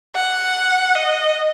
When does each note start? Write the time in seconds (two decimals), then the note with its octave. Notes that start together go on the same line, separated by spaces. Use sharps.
0.15 F#5
0.95 D#5